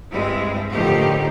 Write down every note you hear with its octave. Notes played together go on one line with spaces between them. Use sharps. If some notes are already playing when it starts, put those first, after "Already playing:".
G2 G#3 C4 E4
A2 D3 D#3 F3 D#4 G4